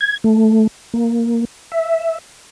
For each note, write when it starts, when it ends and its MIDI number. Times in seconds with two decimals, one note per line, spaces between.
0.01 0.17 92
0.24 0.67 57
0.94 1.45 58
1.72 2.18 76